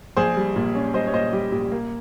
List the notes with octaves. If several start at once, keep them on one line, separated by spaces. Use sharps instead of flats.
A#1 G#4 C5
G3
A#2
C#4
G3 C5 D#5
C#5
A#2 C5 D#5
G3 G4
A#2 G4
A#3